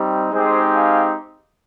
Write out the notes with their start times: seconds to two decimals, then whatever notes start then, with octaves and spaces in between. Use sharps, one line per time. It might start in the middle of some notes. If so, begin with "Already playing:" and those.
Already playing: G3 C4 D#4
0.32 G#3 C4 D#4 G4 G#4 C5
0.73 F5 G#5